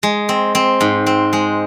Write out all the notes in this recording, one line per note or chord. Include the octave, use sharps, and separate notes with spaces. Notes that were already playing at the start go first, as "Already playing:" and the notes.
G#3
C4
C4
G#2
C4
G#3